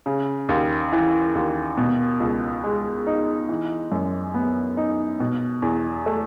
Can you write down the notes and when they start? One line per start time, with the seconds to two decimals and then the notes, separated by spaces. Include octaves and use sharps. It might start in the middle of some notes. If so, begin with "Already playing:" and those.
0.06 C#3
0.49 D#2
0.93 E3
1.35 D#2
1.77 B2
2.20 C#2
2.64 G#3
3.07 D#4
3.49 E3
3.92 F#2
4.34 B3
4.77 D#4
5.20 B2
5.62 E2
6.06 A3